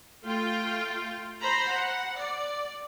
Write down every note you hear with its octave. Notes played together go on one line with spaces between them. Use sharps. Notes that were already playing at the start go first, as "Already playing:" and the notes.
A3 F4 G5
C5 A#5 B5
F#5
D5